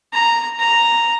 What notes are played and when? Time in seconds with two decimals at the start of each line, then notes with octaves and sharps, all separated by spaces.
0.13 A#5
0.60 A#5